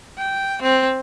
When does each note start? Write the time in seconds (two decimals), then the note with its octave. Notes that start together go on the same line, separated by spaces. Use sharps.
0.18 G5
0.62 C4